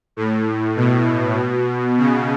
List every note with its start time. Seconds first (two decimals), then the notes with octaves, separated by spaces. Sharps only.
0.16 A2
0.76 B2
1.98 C#3